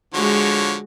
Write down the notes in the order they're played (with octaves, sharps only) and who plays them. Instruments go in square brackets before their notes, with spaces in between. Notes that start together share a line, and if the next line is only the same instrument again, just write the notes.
[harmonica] D3 F3 C#5 [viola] G#3 F#4